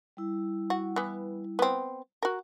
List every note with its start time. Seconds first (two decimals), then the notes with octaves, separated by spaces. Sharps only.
0.17 G3 E4
0.70 F#4
0.96 E3 B3
1.59 B3 C4
2.23 F#4 A#4